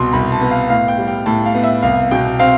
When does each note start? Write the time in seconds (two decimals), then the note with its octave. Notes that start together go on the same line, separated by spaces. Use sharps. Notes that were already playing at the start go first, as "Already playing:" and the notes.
Already playing: C2 B2 C6
0.13 C2 B5
0.32 A5
0.41 B3
0.51 F5
0.70 A2 F5
0.88 G5
0.98 G3
1.08 G5
1.26 A2 A5
1.45 F5
1.55 B3
1.64 E5
1.82 C2 F5
2.11 B2 G5
2.40 C4 F5